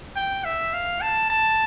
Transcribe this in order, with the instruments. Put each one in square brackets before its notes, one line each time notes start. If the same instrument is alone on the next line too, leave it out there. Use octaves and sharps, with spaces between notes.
[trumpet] G5
E5
F5
A5
A5